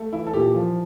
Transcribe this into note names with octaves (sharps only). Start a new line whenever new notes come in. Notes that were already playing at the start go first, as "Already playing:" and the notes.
Already playing: A3
E3 E4
A4
A#2 G4
F3